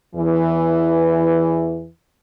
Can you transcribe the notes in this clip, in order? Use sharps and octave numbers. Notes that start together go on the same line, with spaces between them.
E2 E3